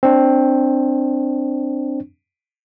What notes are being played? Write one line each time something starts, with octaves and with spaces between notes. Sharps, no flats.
C4 D4